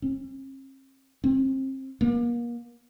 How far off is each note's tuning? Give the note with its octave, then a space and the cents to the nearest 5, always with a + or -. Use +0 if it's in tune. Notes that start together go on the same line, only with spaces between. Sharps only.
C4 +45
C4 +30
A#3 +35